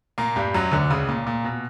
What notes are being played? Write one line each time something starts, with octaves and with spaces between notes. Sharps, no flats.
A#2 A#3
G2 G3
F#2 F#3
D2 D3
C#2 C#3
A#2
A#2
B2